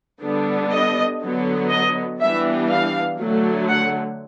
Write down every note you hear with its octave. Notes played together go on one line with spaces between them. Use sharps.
D3 G3 B3 D4
D#5
D3 F#3 B3
D#5
E3 G3 B3 D4 E5
F5
D3 F#3 A3
F#5